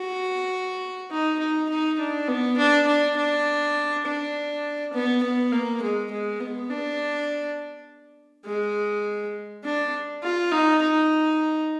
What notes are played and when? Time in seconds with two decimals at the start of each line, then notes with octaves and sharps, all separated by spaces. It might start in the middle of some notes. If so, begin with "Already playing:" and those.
Already playing: F#4
1.11 D#4
1.40 D#4
1.69 D#4
2.00 D4
2.28 B3
2.58 D4
2.87 D4
3.17 D4
4.06 D4
4.94 B3
5.23 B3
5.53 A#3
5.82 G#3
6.11 G#3
6.40 B3
6.70 D4
8.46 G#3
9.64 D4
10.23 F4
10.52 D#4
10.82 D#4